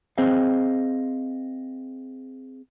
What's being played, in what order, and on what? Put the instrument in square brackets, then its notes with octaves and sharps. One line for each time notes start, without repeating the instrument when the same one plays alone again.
[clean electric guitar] C4 G#4 C5 D#5 F5